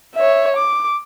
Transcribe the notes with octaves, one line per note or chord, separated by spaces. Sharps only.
C#5 E5
D6